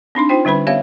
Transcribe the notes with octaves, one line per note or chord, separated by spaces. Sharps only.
C4 D4 D#4 C6
D#4 F4 C5 G5
D3 G3 C#4 B4 B5
B3 G4 C#5 E5 F5